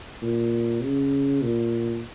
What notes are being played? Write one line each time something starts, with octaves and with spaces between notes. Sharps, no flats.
A#2
C#3
A#2